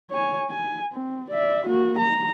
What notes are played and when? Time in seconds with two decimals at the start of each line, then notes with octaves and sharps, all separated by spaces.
0.11 C#5 G#5
0.50 G#5
0.93 C4
1.30 D5 E5
1.66 A#3 F#4
1.98 A#5